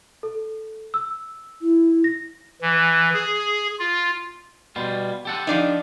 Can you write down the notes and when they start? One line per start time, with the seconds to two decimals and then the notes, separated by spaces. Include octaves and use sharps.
0.23 A4
0.94 E6
1.62 E4
2.04 A#6
2.62 E3
3.13 G#4
3.79 F4
4.76 B2 G3 F4
5.25 G4 A4 F#5
5.47 F3 D4 D#4